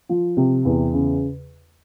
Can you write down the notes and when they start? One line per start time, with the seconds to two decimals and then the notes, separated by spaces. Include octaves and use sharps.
0.09 F3
0.37 C3
0.65 E2
0.93 C#3